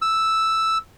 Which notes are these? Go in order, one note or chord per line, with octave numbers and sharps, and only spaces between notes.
E6